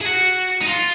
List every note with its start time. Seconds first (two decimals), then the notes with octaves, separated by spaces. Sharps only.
0.01 G#4
0.05 F#4
0.62 D#4
0.66 F4